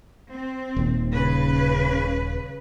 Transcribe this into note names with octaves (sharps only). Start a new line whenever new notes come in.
C4
D#1 D#2
C#3 B4